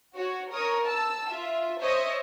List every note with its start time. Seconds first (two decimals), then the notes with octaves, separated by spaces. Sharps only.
0.16 F#4 C#5
0.51 A#4 C#5 D#6
0.86 A5 E6
1.29 F4 E5
1.80 C5 C#5 D#5 E5